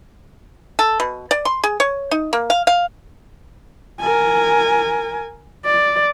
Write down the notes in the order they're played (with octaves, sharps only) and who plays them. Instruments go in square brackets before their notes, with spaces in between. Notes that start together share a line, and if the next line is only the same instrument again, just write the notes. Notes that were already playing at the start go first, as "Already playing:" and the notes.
[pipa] A4
B2
D5
C6
G#4
C#5
D#4
A#3
F5
F5
[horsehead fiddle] A#4 G#5
D5